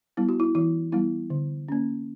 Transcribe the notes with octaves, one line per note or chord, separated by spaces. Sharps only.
G3 B3 E4
F#4
E4
E3 E4
G3 B3 E4
D3
A#3 C#4